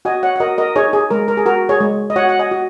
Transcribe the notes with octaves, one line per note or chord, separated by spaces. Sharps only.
F#4 D#5 G#5
C#5 F#5
F#5
F#4 A#4 D#5
A#4 D#5
D#4 G#4 C#5
G#4
G#3 A#4
A#4
G#4
F#4 A#4
G#4 C#5
G#3
D#5
F#4 C#5 F#5
F#5
D#5 G#5
F#4